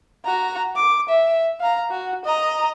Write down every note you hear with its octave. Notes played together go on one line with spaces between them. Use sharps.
F#4 A#5
D6
E5
F5 A#5
F#4
D#5 A#5